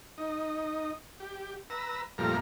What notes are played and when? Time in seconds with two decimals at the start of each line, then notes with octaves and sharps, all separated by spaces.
0.18 D#4
1.20 G4
1.70 B4 A#5 E6
2.18 F2 A#2 G3 A3 A#5 F6